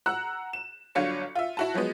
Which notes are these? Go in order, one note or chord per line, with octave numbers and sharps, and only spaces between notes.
F#5 A#5 E6 F#6
E7
G1 F#3 D4 F4 C#5 C#7
F4 E5
E4 F#4 A5
F3 F#3 G#3 B3